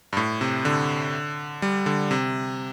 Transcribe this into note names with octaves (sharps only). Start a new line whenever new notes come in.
G2
A2
C3
D3
G3
D3
C3